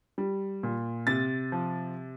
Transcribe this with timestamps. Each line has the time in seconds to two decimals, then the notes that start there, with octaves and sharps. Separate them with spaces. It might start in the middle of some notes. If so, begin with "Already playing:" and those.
0.18 G3
0.63 A#2
1.07 C3 A6
1.52 F3